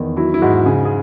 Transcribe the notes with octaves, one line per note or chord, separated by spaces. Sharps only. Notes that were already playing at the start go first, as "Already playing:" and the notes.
Already playing: E2 D#3
F#3 E4
E4
G#2 F#4
C#3 G#4
G#4